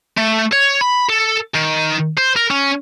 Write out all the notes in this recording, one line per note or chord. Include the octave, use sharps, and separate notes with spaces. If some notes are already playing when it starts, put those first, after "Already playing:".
A3
C#5
B5
A4
D#3
C5
A#4
C#4